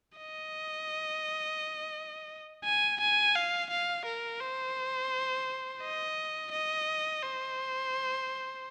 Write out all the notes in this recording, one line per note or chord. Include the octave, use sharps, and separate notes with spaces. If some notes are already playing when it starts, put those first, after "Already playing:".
D#5
G#5
G#5
F5
F5
A#4
C5
D#5
D#5
C5